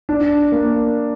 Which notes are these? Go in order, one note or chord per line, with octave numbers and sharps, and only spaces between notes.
D4
A#3